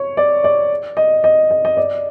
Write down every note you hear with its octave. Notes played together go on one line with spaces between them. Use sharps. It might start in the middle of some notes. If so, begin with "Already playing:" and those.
Already playing: C#5
D5
D5
D#5
D#5
D#5
D#5
D5